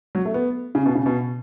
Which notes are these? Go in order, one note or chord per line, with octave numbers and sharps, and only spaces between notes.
F#3
A3
B3
C#3
B2
C#3
B2